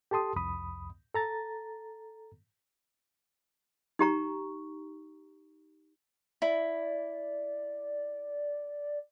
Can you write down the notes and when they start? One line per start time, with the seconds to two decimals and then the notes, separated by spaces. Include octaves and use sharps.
0.11 G4 A4 A5 C6 D#6
0.36 C2 F2 B5 D#6
1.14 A4 A#5 A6
3.99 D#4 G4 A#5 C#6
6.42 E4 D5 B5